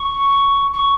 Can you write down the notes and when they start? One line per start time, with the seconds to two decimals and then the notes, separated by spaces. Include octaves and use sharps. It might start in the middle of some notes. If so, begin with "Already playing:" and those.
Already playing: C#6
0.74 C#6